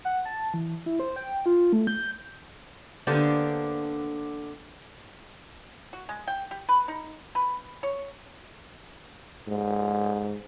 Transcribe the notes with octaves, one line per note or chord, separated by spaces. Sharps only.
F#5
A5
E3
E4
C5
G5
F4
A3
G6
D3 A#3 B3 D4 G4 C5
F#4
G#3
G5
G4
B4
D#4
B4
C#5
G#2